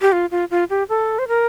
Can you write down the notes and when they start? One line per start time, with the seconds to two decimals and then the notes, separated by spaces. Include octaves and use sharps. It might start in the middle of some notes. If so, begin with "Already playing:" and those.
0.01 G4
0.12 F4
0.31 F4
0.51 F4
0.70 G4
0.89 A4
1.19 C5
1.28 A#4